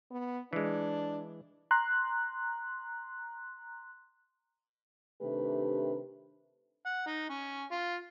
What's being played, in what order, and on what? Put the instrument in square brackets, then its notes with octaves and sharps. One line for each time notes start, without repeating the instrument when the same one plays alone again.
[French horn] B3
[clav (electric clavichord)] E3 G#3 [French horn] D4
[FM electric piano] A#5 C6 F#6
[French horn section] C3 D#3 A3 D4 G4 B4
[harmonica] F#5
D#4
C#4
F4